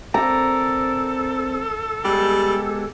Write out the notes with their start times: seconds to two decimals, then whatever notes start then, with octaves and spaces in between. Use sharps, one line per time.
0.14 C4 A4 A#4 D5 A#5
2.05 G3 G#3 B3 G4